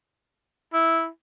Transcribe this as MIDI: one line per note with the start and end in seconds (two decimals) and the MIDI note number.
0.74 1.07 64